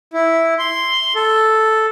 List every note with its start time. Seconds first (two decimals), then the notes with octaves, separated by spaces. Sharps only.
0.13 E4
0.59 C6
1.15 A4